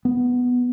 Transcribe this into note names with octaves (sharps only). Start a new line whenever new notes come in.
B3